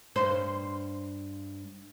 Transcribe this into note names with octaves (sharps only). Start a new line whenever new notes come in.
G2 C5